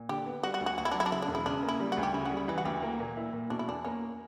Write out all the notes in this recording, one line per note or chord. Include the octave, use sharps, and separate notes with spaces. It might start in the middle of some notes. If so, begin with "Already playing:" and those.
Already playing: A#2
D3 G4
B3
G3 F#4
F#4
D2
F#4
D2 F#4
E4
F#3 D4
E4
D4
C#3 E4
D4
E1
E4
C#3 D4
A#3
E4
G3
F#4
D2
G4
C#3 E4
F#4
G3
E4
E3 E4
F#4
D2 G4
A#3
A#2
E4
A#2
B2 D4
E4
E2 D4
A#3 C#4